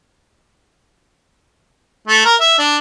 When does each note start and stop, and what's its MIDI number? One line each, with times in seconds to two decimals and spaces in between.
2.08 2.21 57
2.25 2.35 70
2.40 2.54 76
2.59 2.77 62